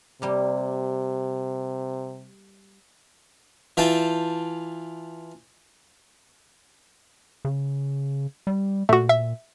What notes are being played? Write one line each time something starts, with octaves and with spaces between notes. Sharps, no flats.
C3 G3 A#3
E3 F4 G5 A5
C#3
G3
A#2 A3 F#4
E5